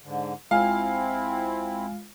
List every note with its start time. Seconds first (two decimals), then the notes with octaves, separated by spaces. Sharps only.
0.02 G#2 D3
0.51 A#1 G#3 C4 E4 F4 F5 G#5